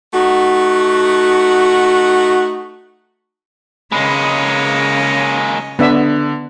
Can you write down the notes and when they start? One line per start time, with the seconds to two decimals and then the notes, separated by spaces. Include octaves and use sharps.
0.13 A3 D#4 F#4
3.92 C#3 G#3 A#3 C#5 D#5 B5
5.79 D3 B3 D4 E5